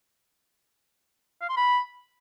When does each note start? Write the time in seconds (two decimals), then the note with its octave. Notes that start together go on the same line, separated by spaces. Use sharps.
1.42 F5
1.49 C6
1.57 B5